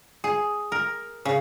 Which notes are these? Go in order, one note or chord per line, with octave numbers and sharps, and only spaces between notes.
G#4
A#4
C#3